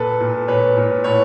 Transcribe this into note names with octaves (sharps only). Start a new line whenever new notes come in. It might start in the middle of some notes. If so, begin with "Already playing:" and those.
Already playing: A#2 A4 B4
A#2
A#2 B4 C#5
A#2
A2 B4 C#5